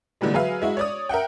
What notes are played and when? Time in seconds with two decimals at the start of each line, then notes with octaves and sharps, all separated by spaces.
0.21 A#2 D3 E3 G3 G#3
0.34 F#3 G#4 B4 E5 F5
0.62 G#3 E4 F#4
0.77 C#5 D5 D#6
1.09 A#4 E5 F#5 G5